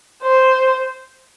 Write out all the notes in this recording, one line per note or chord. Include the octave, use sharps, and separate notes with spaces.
C5